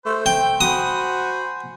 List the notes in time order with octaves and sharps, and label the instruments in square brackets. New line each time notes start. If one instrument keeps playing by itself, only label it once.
[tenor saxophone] A3 [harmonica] C5
[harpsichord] G5
[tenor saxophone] F#4 [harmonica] C5 G#5 B5 [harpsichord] D#6